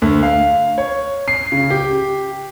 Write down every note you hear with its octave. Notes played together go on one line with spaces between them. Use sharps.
D2
F5
C#5
C7
C#3
G4